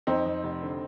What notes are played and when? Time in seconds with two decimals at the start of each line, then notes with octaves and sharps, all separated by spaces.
0.07 F2 C4 D#4
0.26 F2
0.44 F1
0.63 D3